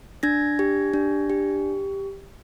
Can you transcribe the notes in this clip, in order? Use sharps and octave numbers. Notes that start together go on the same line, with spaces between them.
D4 G#6 A#6
G4
D4
G4